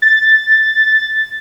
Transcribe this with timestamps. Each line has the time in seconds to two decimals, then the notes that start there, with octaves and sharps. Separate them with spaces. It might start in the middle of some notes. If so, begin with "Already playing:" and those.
0.02 A6